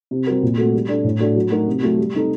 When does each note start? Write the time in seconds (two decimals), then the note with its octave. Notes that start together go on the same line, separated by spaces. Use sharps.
0.11 C3
0.27 G3 C4 F#4 A#4
0.43 A#2
0.58 A3 C4 F#4 A4
0.74 G3
0.89 D4 A4
1.04 A2
1.20 A3 D4 F#4 A4
1.36 F#3
1.51 A3 D#4 F#4 A#4
1.67 C3
1.83 F#3 A3
1.98 G3
2.14 C4 D#4 A4